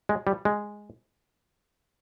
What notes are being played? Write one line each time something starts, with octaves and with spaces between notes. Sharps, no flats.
G#3
G3
G#3